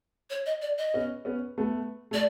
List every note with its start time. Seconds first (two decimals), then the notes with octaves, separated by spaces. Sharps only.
0.30 C#5
0.46 D#5
0.62 D5
0.78 D#5
0.94 B3 C#4
1.25 B3 C#4
1.58 A3 B3
2.11 A3 D5